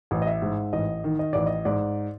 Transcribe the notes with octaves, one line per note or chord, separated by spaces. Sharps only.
A1
D#5
E5
G#2
A1 D#5
D#3
D#5
A1 D5
D#5
G#2 D5